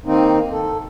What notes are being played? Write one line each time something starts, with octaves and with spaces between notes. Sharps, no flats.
D#3 A#3 C4 D#4
A4